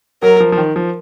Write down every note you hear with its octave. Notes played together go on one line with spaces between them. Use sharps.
F#3 A#4
F3
F3
D#3
F3